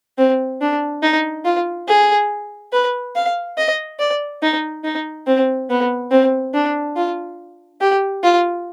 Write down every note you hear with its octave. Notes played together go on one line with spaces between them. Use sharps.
C4
D4
D#4
F4
G#4
B4
F5
D#5
D5
D#4
D#4
C4
B3
C4
D4
F4
G4
F4